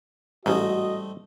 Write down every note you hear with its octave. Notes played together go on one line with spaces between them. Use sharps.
A1 G#2 G3 A3 C4 F#4 D#5